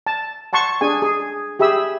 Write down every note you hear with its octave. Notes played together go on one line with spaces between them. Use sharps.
A5
F#5 A5 C6 C#6
D4 G#4 G#5
G#4
G4 G#4 E5 B5 E6